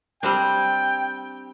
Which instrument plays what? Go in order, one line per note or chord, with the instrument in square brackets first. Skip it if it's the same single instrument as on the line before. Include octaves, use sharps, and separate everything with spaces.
[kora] G3 C4 D4 [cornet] G5